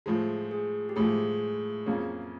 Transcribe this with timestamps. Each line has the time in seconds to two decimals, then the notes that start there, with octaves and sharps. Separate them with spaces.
0.06 A2 F3 G#3 G#4
0.51 G#4
0.89 G4
0.96 A2 F3 G#3 G#4
1.86 F2 C#3 F#3 A#3 C#4